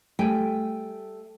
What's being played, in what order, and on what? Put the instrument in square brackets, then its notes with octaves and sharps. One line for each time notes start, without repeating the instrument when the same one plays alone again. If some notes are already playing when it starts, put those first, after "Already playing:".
[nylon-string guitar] G3 A3 G5 G#5